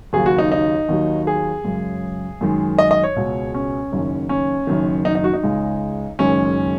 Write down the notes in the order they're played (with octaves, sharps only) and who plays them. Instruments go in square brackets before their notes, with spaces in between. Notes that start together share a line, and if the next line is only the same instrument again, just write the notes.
[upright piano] D#2 C#3 F#3 G#4
F#4
D#4
D#4
D#2 D#3 F#3
G#4
F#2 C#3 G#3
F#2 D#3 G#3
D#5
D#5
C#5
C#2 B2 G#3
C#4
F#1 F#2 D#3 F#3
C#4
F#1 F#2 D#3
D#4
D#4
F#4
D#4
C#2 C#3 G#3
F#1 F#2 D#3 G#3 C#4